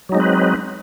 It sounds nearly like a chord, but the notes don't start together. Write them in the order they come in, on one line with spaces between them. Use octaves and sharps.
F#3 D#4 G#3 C4 B4